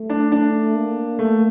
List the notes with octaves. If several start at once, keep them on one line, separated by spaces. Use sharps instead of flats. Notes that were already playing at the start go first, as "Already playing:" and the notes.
Already playing: A3
D4
D4
A#3
A3